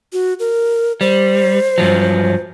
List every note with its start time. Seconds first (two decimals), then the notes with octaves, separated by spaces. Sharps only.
0.13 F#4
0.40 A#4
1.01 G3 C5
1.78 G2 F3 F#3